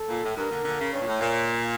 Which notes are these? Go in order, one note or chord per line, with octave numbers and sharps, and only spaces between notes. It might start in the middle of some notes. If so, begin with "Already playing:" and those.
Already playing: A4
A#2
A2
G2 A#4
A#2 D3
A#2 D3
C#3
G2 C#5
A#2
A2
A#2